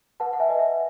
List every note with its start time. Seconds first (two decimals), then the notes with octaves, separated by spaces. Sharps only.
0.20 B4 F#5 A5
0.33 F#5
0.40 E5 G#5
0.49 B4 D#5
0.59 E5